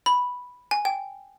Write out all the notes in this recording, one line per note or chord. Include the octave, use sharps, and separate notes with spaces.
B5
G#5
G5